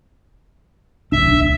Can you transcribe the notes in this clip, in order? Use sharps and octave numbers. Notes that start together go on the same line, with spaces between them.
D1 B1 D4 E5